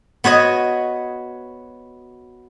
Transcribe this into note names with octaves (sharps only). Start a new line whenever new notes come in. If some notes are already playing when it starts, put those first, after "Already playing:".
B3 F#4 C#5 D#5